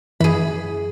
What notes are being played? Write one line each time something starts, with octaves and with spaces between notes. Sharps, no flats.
F#2 E3 G#4 B5